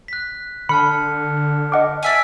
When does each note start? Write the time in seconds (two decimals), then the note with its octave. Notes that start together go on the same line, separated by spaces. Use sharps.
0.08 F#6 B6
0.69 D3 A5 B5 F6 C#7
1.72 D#5 F#5 D6
2.03 D5 E5 G#5